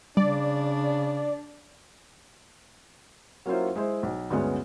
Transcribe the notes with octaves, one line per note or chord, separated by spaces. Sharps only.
C#3 G3 D4 D5
F#3 A#3 C#4 E4 F4 C5
G#3 E4 C5
B1
D2 G2 G#3 B3 C#4